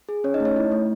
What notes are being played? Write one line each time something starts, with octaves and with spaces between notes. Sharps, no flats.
G#4
C#4 C#5
D#4 D#5
A3
C#5
E4
A3